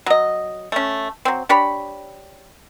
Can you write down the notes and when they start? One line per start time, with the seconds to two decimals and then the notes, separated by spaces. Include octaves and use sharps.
0.06 F#3 D#5
0.72 A3 C#4
1.25 F#3 C4
1.49 D4 G4 C#5 B5